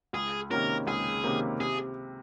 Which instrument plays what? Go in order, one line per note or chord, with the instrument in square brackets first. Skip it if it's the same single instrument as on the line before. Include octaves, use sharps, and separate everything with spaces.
[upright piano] C#2 [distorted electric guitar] G#4
[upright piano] C3 D#3 A#3 C#4 [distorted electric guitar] A#4
[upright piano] C#2 [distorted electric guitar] G#4
[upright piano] C3 D#3 A#3 C#4
[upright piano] C3 [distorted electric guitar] G#4